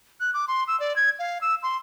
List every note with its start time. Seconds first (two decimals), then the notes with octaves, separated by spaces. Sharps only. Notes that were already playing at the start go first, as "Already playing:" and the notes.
0.20 F#6
0.34 D6
0.48 C6
0.68 E6
0.80 D5
0.96 G#6
1.19 F5
1.41 E6
1.63 C6